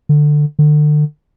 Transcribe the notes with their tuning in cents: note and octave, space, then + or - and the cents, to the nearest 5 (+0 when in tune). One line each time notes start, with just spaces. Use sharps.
D3 +15
D3 +35